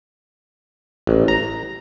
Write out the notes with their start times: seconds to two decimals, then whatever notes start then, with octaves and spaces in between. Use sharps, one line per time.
1.07 A1
1.28 A#5